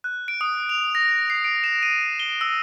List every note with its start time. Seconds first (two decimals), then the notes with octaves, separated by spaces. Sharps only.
0.04 F#6
0.28 D7
0.41 D#6
0.69 F7
0.95 A#6
1.30 C7
1.44 D7
1.64 E7
1.83 D#7
2.20 G7
2.41 E6